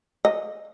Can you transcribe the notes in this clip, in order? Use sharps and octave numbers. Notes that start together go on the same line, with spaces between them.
D#5